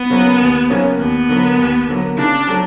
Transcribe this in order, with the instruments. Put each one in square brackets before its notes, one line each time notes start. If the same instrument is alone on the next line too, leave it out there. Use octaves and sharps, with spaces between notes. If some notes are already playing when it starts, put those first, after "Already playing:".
Already playing: [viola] B3
[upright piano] C#3 F#3 A#3 C#4
D#2
C#3 F#3 A#3 C#4
[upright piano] D#2 [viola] B3
[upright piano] D3 F#3 A#3
D#2
D3 F#3 A#3
[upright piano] C#3 [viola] D4
[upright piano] F#3 A3